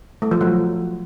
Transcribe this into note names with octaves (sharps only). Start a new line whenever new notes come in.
A3
F3
F#3